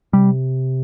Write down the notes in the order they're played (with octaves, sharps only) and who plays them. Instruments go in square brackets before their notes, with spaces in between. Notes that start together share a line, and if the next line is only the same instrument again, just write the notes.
[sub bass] C3 [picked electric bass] G3